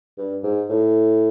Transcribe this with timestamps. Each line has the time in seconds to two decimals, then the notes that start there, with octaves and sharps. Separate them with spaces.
0.18 G2
0.43 G#2
0.69 A2